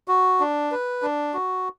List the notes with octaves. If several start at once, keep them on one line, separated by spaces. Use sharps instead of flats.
F#4
D4
B4
D4
F#4